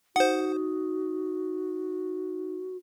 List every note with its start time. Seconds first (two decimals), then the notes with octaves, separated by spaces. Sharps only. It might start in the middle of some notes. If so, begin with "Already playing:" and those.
0.16 D#4 F#4 C5 F#5